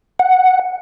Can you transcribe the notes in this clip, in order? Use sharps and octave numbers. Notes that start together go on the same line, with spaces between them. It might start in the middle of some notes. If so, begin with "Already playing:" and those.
F#5